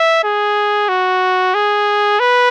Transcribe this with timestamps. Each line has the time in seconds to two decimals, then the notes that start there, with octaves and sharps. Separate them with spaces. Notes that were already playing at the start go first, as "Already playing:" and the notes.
Already playing: E5
0.24 G#4
0.89 F#4
1.54 G#4
2.20 B4